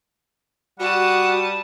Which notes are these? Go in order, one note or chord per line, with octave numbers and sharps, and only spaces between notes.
G3 F#4 F#5 A5 D#6